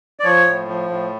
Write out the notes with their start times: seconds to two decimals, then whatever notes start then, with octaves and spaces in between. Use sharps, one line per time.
0.20 D5
0.24 F3 C#5
0.46 A2
0.68 F3
0.89 A2